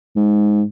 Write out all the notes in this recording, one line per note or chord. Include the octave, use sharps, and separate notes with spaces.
G#2